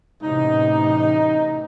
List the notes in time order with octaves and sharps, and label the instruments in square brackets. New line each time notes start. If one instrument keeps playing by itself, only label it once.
[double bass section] A1 C3 [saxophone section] D#4